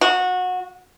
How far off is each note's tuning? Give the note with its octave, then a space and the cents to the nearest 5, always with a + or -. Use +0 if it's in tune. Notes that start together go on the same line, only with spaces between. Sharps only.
F#4 -20